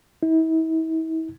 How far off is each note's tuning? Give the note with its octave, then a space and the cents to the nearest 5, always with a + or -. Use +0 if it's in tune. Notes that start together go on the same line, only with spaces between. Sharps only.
E4 -40